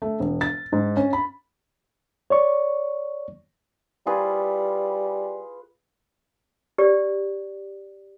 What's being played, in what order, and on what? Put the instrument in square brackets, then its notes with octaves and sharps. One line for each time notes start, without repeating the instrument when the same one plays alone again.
[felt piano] A3
E1
A6
G#2
C#4
B5
[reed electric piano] C#5 D5 C#6
[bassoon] G3 [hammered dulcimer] F4 G#4 B4
[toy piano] G4 D5